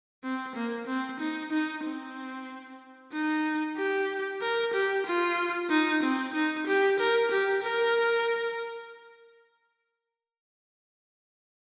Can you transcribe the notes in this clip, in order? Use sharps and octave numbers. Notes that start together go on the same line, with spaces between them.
C4
A#3
C4
D#4
D#4
C4
D#4
G4
A#4
G4
F4
D#4
C4
D#4
G4
A#4
G4
A#4